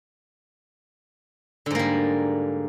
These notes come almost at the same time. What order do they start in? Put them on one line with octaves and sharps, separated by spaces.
D3 G#2 A#3 G3